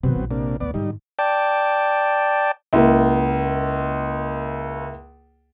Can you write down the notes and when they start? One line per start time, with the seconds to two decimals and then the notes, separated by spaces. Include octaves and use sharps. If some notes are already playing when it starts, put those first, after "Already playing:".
0.03 C3 D#3 F#3 B3 C4
0.15 A#1 E4
0.31 C3 A#3 D4
0.60 A1 D2 B3 D5
0.74 G#2 D3 G3 D#4
1.19 D5 G5 A5
2.73 C#2 A#3 E4